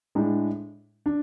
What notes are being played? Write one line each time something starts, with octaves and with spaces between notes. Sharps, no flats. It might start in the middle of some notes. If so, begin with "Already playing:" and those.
A2 G#3 D4
D4